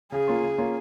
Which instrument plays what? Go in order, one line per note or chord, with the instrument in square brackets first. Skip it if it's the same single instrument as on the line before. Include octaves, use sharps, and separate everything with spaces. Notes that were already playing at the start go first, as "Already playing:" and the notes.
[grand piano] C#3 [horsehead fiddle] G#4
[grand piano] A#3 C#4 F4
C#3
A#3 C#4 F4